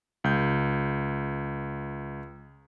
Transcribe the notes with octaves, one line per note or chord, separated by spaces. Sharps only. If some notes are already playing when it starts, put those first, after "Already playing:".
C#2 G6